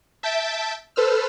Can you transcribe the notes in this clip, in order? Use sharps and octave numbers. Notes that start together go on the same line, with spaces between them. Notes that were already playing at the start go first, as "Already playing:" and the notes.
E5 A5 G6 A6 B6 D7
A4 B4 C5 E6 F6